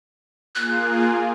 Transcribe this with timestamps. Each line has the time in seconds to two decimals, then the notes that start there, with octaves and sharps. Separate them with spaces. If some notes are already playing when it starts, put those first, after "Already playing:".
0.55 A#3 F4 G#4 F#6